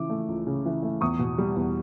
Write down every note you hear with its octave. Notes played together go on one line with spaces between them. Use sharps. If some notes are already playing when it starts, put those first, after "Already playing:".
Already playing: C#3 E3 D6
A3
C#2
C#3
E3
A3
E2 C#6 D#6
B2
G3
E2